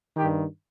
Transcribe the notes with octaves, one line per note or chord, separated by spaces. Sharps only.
D#3 G4
G2